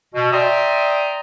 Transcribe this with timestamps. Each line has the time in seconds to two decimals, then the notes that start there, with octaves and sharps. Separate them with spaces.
0.14 B2
0.32 D5 E5 G5 A#5 C6 D#6